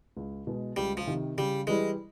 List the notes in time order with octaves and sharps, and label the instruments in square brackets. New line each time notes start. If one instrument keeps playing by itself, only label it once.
[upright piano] C#2
B2 G#3
[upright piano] C#2 [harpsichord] G3
[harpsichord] F3
[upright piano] C3 D#3
[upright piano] C#3 [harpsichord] G3
[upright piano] E3 G3 [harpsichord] G#3